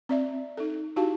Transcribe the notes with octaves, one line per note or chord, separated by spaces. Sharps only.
C4 D5 E5
D#4 A4
D#4 E4 F#4 G4 F5 A5